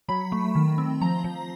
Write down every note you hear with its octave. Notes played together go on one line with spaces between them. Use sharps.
F#3 B5
A3
D#3
C4
F3 A#5
F3